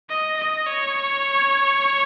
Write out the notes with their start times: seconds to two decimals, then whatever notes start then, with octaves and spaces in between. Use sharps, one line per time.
0.09 D#5
0.37 D#5
0.66 C#5